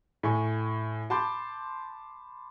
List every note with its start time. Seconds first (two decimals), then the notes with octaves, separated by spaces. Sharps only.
0.23 A2 G#5 C#6
1.10 A5 B5 C6 D6 G6